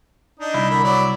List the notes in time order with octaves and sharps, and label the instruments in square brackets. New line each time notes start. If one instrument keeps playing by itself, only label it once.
[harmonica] D4 D#4 D#5
[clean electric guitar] C2 E4
[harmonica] D3 A#4 B5
F#3 D5 B5